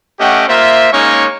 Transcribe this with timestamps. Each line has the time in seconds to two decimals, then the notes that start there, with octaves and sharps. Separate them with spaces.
0.19 A3 C#4 G4 D#5 F#5 G5
0.48 A#3 F4 C5 E5
0.92 G#3 A#3 C#4 D#4 C#5 C#6